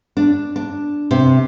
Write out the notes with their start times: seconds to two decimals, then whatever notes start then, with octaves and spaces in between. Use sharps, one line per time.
0.17 D4
0.56 D4
1.11 C3